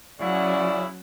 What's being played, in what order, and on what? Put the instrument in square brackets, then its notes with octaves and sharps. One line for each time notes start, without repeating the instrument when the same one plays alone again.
[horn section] C#3 E4 [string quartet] F#3 C#4 F#5 [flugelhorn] D5